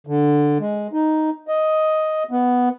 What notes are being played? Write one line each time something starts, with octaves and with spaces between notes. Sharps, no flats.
D3
G#3
D#4
D#5
B3